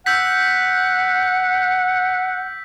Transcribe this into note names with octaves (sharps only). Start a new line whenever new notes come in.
F#5 E6 G6 B6